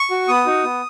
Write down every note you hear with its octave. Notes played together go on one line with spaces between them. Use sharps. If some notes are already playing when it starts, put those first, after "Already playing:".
Already playing: C#6
F#4
B3 D#6
D#4 F#4
B3